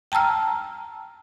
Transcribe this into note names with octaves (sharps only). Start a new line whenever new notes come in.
G5 A5 A#5 E6 F6